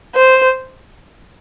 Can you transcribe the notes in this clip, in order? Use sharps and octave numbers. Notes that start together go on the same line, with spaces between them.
C5